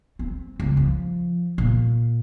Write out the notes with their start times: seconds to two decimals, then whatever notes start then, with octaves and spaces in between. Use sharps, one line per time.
0.19 C4
0.60 C#2
0.77 F3
1.58 A#2